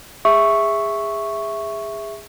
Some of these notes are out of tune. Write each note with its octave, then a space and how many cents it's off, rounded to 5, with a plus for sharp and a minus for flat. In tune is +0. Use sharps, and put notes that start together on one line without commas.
G#4 -20 E5 +0 C#6 +0